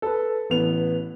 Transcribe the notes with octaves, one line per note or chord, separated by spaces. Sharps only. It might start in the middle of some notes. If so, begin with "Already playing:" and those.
A4 B4
A1 B3 F7